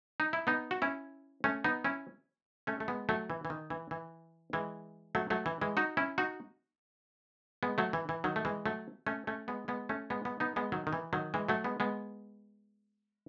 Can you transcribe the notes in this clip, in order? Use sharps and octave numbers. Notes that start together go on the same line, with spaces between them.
D#4
E4
B3 D#4
F#4
C#4 E4
A3 C#4
B3 D#4
C#4 E4
A3 C#4
A3
G#3 B3
F#3 A3
E3
E3
D#3
E3
E3
E3 G#3
F#3 A3
F#3 A3
E3
E3 G#3
D#4 F#4
C#4 E4
D#4 F#4
G#3 B3
F#3 A3
E3
E3
D#3 F#3
A3
E3 G#3
F#3 A3
A3 C#4
A3 C#4
G#3 B3
G#3 B3
A3 C#4
G#3 B3
G#3 B3
B3 D#4
G#3 B3
D#3 F#3
D#3
E3
D#3 F#3
E3 G#3
F#3 A3
G#3 B3
G#3 B3